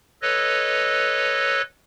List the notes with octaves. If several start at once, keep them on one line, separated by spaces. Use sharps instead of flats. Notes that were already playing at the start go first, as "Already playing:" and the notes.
A4 B4 C#5 D#5